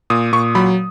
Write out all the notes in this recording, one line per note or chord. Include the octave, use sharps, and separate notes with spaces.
A#2 D#6
A#2 C#6
F#3 B5